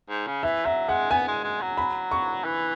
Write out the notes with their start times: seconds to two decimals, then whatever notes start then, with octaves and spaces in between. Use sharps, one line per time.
0.10 G#2
0.27 C#3
0.43 E3 E5
0.66 F#3 E5
0.89 G#3 F#5
1.11 B3 G#5
1.28 G#3
1.44 G#3
1.61 F#3
1.77 B5
2.11 C#6
2.44 E3